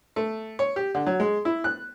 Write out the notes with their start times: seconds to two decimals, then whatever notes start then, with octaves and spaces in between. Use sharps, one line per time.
0.16 A3
0.59 C#5
0.76 G4
0.95 D3
1.07 F#3
1.20 G#3
1.45 E4
1.64 F#6